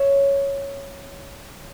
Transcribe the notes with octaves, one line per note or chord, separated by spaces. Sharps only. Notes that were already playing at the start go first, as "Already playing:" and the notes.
Already playing: C#5 E5